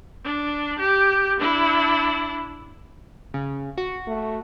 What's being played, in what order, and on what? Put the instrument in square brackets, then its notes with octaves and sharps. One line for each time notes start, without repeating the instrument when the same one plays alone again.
[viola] D4
G4
D4 E4
[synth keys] C#3
F#4
[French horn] A3